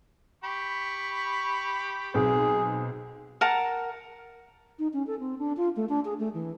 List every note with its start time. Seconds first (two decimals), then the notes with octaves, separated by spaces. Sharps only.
0.44 G4 B5 C#6
2.14 B1 C4 G#4
3.41 A#4 F#5 A5 A#5
4.79 D#4
4.93 C#4
5.07 A4
5.20 C4
5.39 D4
5.57 F4
5.76 A3
5.89 D4
6.05 G#4
6.19 A3
6.34 E3